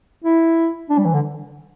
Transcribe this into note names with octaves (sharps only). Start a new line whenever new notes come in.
E4
D4
G3
E3
D3